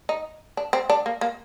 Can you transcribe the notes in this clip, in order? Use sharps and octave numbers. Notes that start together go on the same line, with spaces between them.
D#4
D4
C4
D4
A#3
A#3